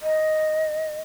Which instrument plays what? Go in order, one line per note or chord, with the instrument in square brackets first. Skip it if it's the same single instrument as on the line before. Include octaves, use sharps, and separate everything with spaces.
[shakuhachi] D#5